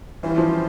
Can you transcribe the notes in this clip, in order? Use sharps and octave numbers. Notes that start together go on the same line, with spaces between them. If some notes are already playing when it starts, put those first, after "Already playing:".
E3 G3 C#4 F4 C5
F3